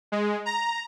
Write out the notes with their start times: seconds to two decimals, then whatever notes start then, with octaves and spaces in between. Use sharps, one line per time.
0.12 G#3
0.46 A#5